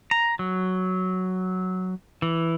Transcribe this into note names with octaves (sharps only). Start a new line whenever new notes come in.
A#5
F#3
E3